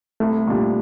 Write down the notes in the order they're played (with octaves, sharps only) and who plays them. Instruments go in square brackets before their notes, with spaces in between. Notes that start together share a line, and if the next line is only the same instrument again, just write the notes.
[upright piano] C2 [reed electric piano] A3
[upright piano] A#2 G3 D4 G4